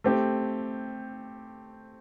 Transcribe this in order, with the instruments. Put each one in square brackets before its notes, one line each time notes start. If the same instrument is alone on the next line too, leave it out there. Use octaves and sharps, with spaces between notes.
[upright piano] A3 C4 G4